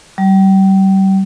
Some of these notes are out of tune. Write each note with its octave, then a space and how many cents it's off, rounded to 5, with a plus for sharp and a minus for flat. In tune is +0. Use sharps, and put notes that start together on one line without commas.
G3 -30